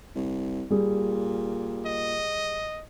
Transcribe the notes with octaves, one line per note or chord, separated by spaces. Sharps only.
C2
A#2 G3 G#4
D#5